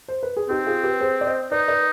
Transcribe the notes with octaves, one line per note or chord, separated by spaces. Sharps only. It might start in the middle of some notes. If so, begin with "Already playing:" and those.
C5
B4
G#4
C4 D#4 G4
F4 G#4
G4 B4
G#4 C5
D5
C5 D#5
D#4 B4 D5
B4 D5